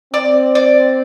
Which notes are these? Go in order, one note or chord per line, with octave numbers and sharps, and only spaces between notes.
C4 D5
D5